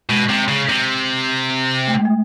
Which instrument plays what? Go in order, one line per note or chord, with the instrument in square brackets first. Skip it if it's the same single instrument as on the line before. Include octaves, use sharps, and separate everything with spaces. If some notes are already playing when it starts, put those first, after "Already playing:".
[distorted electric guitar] B2 [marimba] G#3
[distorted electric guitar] C3
C#3
C3
[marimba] A3
G#3
A3